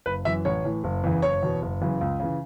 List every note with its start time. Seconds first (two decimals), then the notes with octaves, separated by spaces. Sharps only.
0.06 F#1 B4
0.25 F#2 E3 E5
0.45 A1 C#5
0.65 A2 E3
0.84 F#1
1.04 E2 C#3 E3
1.22 F#1 C#5
1.43 E2 B2
1.62 F#1
1.81 F#2 C#3 E3
2.01 C#2
2.20 C#3 E3